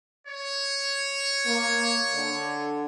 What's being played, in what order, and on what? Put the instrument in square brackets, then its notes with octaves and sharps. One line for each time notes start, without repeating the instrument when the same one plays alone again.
[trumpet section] C#5
[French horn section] A#3
D3